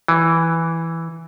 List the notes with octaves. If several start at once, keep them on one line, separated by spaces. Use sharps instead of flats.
E3